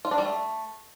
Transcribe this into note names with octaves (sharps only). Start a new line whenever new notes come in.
F4
D4
G3
A3